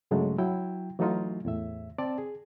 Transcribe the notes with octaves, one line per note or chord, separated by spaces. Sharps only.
G2 C#3 F#3 G#3 A3
F#3 E4 G5
E3 F#3 A3 D#4 F4
E2 A2 E5
C4 D5 A5
G#4